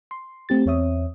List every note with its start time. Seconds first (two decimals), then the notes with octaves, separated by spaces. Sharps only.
0.11 C6
0.49 A3 C4 G4 A6
0.66 E2 C4 C#5 E5 D#6